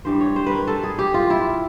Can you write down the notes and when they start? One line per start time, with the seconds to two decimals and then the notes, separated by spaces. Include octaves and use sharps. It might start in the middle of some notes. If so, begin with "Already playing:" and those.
0.05 G2 E3 G3 C5
0.21 C#5
0.36 C5
0.46 A#4 B4
0.67 A4
0.83 G#4
0.99 G4
1.14 F4
1.30 E4